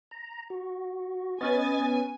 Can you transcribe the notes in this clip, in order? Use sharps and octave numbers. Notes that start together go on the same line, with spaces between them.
A#5
F#4
B3 C#4 B4 D#5 G#5 A6